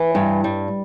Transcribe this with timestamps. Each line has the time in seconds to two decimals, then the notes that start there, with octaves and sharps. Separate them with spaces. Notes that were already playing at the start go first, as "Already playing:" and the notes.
Already playing: E3
0.15 G2
0.44 G3